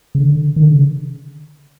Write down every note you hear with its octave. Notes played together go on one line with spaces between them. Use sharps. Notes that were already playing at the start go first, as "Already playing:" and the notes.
C#3
D3
D#3
D3
C#3